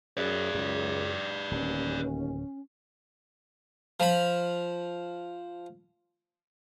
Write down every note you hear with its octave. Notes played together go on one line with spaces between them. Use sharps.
F#2 G#4 B4 D5
C#2 F#2
D1 D#2 C#4
F3 B5